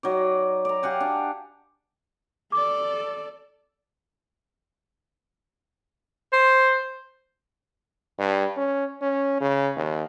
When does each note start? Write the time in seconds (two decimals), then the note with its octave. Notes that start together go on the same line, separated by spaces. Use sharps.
0.03 F#3 D#4 D5
0.65 D5 A#5
0.83 G4 F5 F#5 G#5
1.00 D4
2.52 A4 D5 D6
6.33 C5
8.19 G2
8.57 C#4
9.02 C#4
9.40 C#3
9.76 D#2